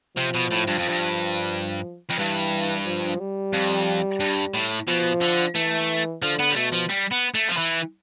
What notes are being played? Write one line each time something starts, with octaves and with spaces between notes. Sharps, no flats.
C3 F3
B2
A2
G2
F2
G2
F2
G2 E3
F3
G3
F2
G2
A2
B2 F3
D3
E3 A3
D3 F3
B3
G3
B2 A3
F3
G3
B3
A3
F3
E3